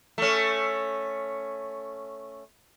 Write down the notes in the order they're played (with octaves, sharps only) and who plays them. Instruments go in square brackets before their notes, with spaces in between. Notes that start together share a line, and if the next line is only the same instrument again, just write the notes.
[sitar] A3 C#4